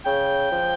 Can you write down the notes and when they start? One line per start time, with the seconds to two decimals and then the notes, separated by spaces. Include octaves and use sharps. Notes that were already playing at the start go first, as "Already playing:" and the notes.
0.05 C#3 G5
0.52 F3